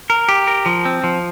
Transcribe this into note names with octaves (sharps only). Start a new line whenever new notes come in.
A#4
G4
A#4
F3
C4
F3